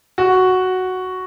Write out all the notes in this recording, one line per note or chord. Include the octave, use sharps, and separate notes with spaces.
F#4